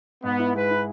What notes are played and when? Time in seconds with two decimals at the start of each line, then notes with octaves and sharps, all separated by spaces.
0.23 G#2 B3
0.39 E4
0.55 G#3 B4
0.71 E4